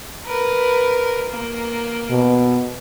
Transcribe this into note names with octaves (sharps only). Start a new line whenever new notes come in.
A#4 B4
A#3
B2